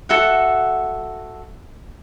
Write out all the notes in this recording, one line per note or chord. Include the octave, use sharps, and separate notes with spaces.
F#4 A4 E5 F#5